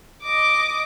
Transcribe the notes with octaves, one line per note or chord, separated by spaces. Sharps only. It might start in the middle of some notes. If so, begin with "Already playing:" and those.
D#5 D6